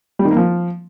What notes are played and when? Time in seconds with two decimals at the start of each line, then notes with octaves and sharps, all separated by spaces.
0.19 G3
0.25 D#3
0.31 A#3
0.37 F3